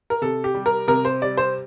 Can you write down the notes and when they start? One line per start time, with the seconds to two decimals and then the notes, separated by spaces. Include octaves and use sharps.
0.10 A#4
0.22 C3 A4
0.44 G4
0.55 G3
0.66 A#4
0.88 C3 A#4
1.05 C5
1.22 G3 D5
1.37 C5